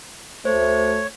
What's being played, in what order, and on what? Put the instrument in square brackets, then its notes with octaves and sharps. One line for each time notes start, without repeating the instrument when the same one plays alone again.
[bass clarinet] D2 [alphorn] A3 [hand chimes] C5 [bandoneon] C#5